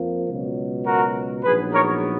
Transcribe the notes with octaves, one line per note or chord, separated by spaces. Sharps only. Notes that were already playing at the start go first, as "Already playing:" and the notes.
Already playing: F2 F3 A#3
C#2 B2 F#3
F#4 A#4
A#1 G#2 F#3 B3 G#4 B4
A#4 C#5